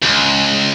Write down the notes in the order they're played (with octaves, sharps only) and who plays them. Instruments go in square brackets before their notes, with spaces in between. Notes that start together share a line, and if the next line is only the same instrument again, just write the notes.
[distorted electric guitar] C#2